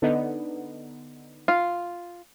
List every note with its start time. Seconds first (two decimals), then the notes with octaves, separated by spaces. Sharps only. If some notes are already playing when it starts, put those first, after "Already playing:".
0.02 D3 B3 D#4
1.48 F4